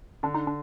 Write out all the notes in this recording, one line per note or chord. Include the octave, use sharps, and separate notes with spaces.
D3 D4
D#4
D4